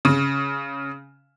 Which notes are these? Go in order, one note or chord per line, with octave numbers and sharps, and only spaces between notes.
C#3